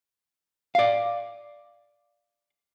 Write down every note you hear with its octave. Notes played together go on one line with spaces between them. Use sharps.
D5 F5